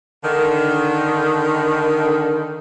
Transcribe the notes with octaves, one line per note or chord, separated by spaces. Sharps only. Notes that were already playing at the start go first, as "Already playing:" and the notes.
D3 D#3